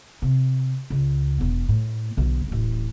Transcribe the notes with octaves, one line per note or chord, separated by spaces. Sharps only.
C3
C#2
E1 B3
A2
B1 D3
D1 A1